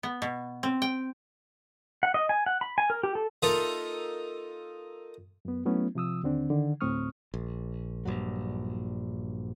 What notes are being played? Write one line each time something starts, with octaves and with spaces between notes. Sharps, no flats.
B3
B2
C4
G5
F#5
D#5
G#5
F#5
B5
G#5
A#4
G4
A4
A#3 D#4 F4 A4 A#4 E5
F#2 B3
F#3 A3 B3 C#4 E4
C3 F3 D#6 E6
D#2 D3 C4 D4
D3 D#3
D2 A2 C4 C#6 D#6 F6
A#1
A#1 G2 A#2 F#3